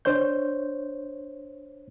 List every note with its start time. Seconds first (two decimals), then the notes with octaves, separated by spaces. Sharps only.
0.05 D4 C5 C#5 G6